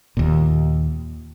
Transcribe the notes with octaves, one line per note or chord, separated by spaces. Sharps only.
D#2 A#2